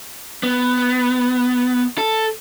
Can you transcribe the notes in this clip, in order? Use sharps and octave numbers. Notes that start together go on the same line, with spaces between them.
B3
A4